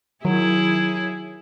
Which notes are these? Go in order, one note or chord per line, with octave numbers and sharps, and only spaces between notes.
D#3 F#3 E4 G#4